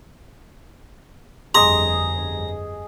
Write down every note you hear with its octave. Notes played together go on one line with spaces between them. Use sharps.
G1 F2 G#4 D#5 A#5 C6 D6 D#6